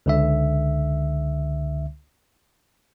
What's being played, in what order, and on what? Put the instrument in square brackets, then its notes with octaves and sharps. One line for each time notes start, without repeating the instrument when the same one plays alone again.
[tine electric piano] C#2 D3 E5